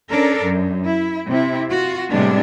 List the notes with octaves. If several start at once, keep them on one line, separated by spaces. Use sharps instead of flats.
C#4 D4 A4 A#4
F#2
E4
C3 C4 E4
F4 F#4
A2 C3 G3 G#3 B3 D4